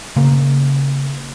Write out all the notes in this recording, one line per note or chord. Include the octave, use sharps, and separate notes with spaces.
C#3 A#3